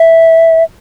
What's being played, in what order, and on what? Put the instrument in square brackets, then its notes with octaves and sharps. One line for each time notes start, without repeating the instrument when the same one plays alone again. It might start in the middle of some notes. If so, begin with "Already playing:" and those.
Already playing: [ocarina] E5